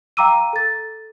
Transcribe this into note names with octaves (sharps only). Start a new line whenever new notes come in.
F5 G5 A#5 D6 E6 D#7
A4 A6